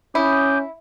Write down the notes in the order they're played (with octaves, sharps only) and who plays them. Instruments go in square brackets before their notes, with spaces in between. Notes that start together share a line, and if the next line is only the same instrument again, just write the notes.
[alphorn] C#4 [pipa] E4 [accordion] D6 D#6 G6